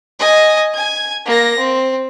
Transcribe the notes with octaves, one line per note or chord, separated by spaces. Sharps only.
D#5 G#5
G#5 G#6
A#3 A#6
C4